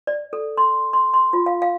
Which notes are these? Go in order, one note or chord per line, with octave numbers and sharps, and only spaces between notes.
D5
A4
C6
C6
C6
F4
F5
F5